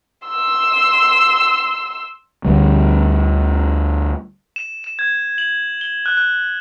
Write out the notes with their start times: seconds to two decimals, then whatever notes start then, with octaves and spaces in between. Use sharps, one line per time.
0.28 C6 E6
2.45 D2 D3 G3
4.56 E7
4.84 E7
4.99 G#6
5.38 F#7
5.81 G7
6.06 F#6
6.17 F#6